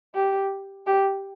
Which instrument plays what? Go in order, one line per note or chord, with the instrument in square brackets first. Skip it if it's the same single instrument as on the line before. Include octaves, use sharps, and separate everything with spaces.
[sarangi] G4
G4